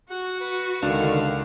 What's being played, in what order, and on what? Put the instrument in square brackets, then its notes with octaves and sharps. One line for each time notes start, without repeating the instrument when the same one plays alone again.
[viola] F#4 [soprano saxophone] F#5
[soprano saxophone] B4
[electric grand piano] C#2 D4 [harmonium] D3 D#3 [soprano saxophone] F5